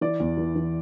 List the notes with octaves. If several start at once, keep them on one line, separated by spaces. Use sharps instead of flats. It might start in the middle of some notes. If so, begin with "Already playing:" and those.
E3 D5
E2
E3
E3